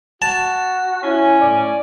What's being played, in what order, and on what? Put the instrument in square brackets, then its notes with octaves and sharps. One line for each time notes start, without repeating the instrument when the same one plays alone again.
[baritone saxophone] F#4 [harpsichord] A5
[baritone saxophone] C#4 [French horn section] E4 C#5 [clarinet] G#5
[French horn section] A2 [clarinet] D5